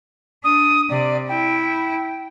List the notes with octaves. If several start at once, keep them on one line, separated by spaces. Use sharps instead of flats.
D4 D#6
C3 D5
E4 G5